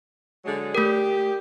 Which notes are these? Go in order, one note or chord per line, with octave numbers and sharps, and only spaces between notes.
D3 F#3 G#3
A3 G4 A#4